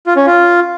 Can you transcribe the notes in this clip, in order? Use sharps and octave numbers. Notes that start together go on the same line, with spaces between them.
F4
C#4
F4